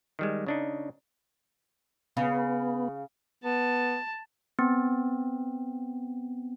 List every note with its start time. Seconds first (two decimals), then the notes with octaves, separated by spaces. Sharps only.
0.19 D#3 G3 G#3
0.47 C#3 D4 D#4
2.17 C#3 B3 F5
3.44 B3 A5
4.59 B3 C4